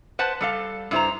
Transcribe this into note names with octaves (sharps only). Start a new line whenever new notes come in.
B4 C5 F#5 A5
G3 A4 F5
G2 E4 C5 A#5